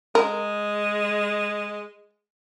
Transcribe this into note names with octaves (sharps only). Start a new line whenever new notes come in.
G#3 A#4